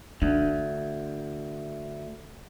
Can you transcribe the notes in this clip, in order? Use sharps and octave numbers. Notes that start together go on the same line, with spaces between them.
D2 D4